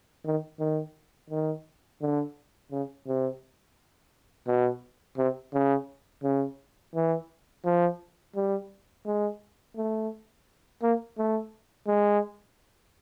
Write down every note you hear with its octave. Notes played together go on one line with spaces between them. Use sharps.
D#3
D#3
D#3
D3
C#3
C3
B2
C3
C#3
C#3
E3
F3
G3
G#3
A3
A#3
A3
G#3